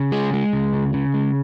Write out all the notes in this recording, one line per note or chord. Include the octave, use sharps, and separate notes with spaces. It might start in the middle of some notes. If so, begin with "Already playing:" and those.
Already playing: C#3
G#3 G#4
G#3
C#2
C#3
C#3
G#3